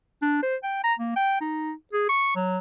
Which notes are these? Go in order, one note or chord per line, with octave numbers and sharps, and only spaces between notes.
D4
C5
G5
A#5
A#3
G5
D#4
G#4
C#6
F#3